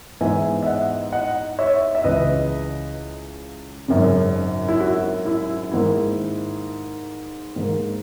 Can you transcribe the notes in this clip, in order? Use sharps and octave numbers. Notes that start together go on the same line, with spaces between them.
G#2 E3 B3 D#4 E5 G#5
E5
D#5 F#5
D#5 F#5
C#5 E5
E5
C#2 C#3 E3 B4 D#5
G#1 F#2 C#3
E4
F#4
E4
G#2 D#3 A#3 E4
G#2 D#3 A#3